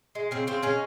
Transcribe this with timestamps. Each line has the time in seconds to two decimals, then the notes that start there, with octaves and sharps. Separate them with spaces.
0.15 G#3
0.31 C#3 C4
0.47 C#3 C4
0.63 G#3 C#4